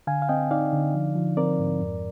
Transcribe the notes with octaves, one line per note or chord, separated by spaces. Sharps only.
D3 F5 G#5
F5
C4 D#5 G5
D#4 D5 F5
D3
F3
F3
C4 A#4 D5
G#2
F2